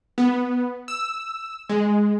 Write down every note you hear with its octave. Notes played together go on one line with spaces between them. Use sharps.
B3
E6
G#3